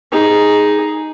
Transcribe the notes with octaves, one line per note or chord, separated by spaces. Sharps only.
D#4 G#4